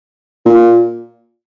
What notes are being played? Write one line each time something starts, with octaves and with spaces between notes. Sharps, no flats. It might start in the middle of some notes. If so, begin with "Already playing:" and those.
A#2